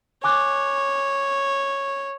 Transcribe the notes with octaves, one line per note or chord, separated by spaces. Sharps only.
C#5 G#5 D6 F#6